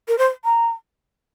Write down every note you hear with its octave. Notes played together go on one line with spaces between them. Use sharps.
A#4
C5
A#5